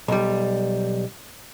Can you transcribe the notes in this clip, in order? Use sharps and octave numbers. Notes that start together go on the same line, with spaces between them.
B1 G3